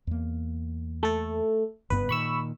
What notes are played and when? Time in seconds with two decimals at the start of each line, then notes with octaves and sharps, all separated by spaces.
0.07 E2 A#3
1.03 A3 A4
1.90 F#1 G2 B3 B4
2.09 A#2 D#3 B5 C#6 E6